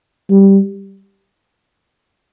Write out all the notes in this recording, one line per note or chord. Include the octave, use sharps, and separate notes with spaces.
G3